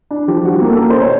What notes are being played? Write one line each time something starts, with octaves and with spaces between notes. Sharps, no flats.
D4
F3 G4
G3 F#4
A#3
A4
C#4 A#4
C5
B2
C#5